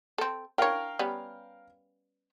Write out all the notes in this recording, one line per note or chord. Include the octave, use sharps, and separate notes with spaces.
C4 A4
D4 A#4 C#5 F5 G5
G3 B3 C#4